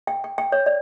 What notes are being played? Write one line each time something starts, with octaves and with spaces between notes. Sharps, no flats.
G5
G5
G5
C#5
D5